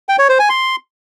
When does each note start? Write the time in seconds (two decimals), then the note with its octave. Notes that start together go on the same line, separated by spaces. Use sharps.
0.09 G5
0.19 C#5
0.29 C5
0.39 G#5
0.49 C6